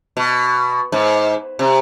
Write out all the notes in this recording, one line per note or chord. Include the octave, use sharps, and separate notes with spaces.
B2
G#2
C3